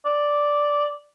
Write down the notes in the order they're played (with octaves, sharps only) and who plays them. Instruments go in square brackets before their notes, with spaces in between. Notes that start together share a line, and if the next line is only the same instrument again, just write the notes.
[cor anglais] D5